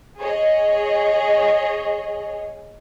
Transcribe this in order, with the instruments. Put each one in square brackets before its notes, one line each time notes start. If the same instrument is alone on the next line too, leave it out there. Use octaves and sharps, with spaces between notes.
[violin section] G#4 C#5 D#5